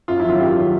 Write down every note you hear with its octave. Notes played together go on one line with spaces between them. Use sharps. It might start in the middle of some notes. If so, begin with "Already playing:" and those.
F#2 F4
E4
D#3 F#3 F4
F#2 G4
D#3 F#3